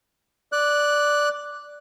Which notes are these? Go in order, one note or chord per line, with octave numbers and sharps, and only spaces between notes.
D5 F#6